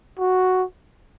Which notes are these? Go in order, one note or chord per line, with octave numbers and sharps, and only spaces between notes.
F#4